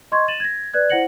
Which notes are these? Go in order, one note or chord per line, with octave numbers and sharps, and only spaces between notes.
D#5 C6 C#6 G#6
A6 D#7 E7 F#7
G#6 A#6
B4 D5 F#6 G#6
E4 C5 F#5 A#6 C#7 F#7